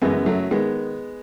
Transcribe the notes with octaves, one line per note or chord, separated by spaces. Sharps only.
F#2 C#3 E3 G#3 B3
F#3 A3
D#3 G#3 B3